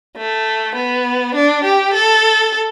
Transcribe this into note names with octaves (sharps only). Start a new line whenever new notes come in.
A3
B3
D4
G4
A4